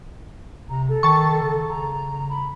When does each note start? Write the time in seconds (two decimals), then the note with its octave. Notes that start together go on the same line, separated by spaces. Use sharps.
0.70 C3 A#5
0.89 A4
1.03 D#3 A5 C#6
1.42 C#3
1.69 A#5
2.30 B5